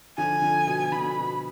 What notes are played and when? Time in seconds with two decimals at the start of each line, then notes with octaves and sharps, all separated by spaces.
0.17 D3 F3 G#5
0.42 D3
0.67 B2
0.92 D3 B5
1.01 B2
1.17 B2